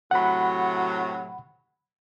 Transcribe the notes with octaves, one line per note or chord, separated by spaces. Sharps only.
A2 C3 F#3 F#5 B5